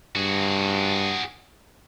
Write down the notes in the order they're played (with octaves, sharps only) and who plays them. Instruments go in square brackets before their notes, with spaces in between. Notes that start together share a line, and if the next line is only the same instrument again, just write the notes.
[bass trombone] G2 [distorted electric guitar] F#4 G#4